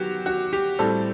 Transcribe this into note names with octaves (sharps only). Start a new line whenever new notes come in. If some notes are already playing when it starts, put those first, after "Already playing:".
Already playing: D#3 F#3 B3 F#4 G4
F#4
G4
A2 G3 C4 A4